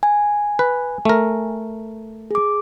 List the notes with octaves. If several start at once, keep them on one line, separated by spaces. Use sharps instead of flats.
G#5
B4
A3 A#4
G#4 D6